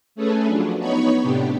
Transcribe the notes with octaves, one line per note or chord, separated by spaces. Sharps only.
A3 C#4 G#4 A4 B4
F3 F#3 D4
B3 D#4 C#5 B5 C#6
A2 C3 B3 D4 G4